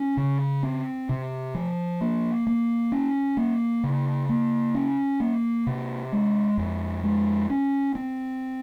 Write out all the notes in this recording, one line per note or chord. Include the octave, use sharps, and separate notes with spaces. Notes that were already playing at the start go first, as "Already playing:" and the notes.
Already playing: C#4
C#3
C4
C3
F3
A#3
A#3
C#4
A#3
C#3
A#3
C#4
A#3
C3
G#3
F2
G#3
C#4
C4